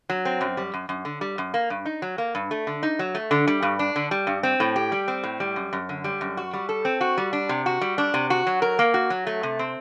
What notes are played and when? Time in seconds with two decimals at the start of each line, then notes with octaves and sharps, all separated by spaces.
0.10 F#3
0.25 C4
0.41 F#2
0.57 G3
0.74 F#2
0.89 F#2
1.05 D3
1.21 G3
1.38 F#2
1.54 A#3
1.70 G2
1.85 D#4
2.02 F#3
2.18 A#3
2.35 G2
2.51 A3
2.67 D3
2.83 D#4
2.99 F#3
3.15 A3
3.31 D3
3.47 G3
3.62 G2
3.79 D4
3.96 D3
4.11 G3
4.27 G2
4.43 C4
4.60 A2
4.76 G4
4.92 G3
5.08 C4
5.23 A2
5.40 G3
5.56 F#2
5.73 F#2
5.89 D3
6.04 G3
6.21 F#2
6.37 F#4
6.53 G3
6.69 A4
6.85 C4
7.01 F#4
7.17 G3
7.33 D4
7.49 C3
7.66 F#4
7.81 G3
7.98 D4
8.14 C3
8.30 F#4
8.47 F#3
8.62 A#4
8.79 A#3
8.94 F#4
9.10 F#3
9.27 A3
9.43 C3
9.59 C4